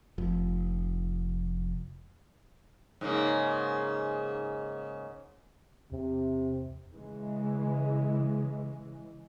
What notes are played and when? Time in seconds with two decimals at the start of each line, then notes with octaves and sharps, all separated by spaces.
0.18 F1 F3
3.01 G#2 C#3 A#3
5.92 E2 C3
6.92 C#3 E3 G#3